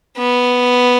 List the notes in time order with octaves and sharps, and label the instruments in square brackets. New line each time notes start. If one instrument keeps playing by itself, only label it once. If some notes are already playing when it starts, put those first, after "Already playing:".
[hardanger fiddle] B3